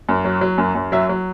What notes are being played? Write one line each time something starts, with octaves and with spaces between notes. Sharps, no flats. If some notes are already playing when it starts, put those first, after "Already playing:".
F#2
F#3
F#3
F#2
F#2
F#3 E5
F#3